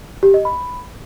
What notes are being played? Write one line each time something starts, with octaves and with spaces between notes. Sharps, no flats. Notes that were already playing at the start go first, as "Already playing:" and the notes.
G4
D#5
B5